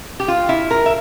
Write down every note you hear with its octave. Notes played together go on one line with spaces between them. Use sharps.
G4
F4
E4
A#4
E5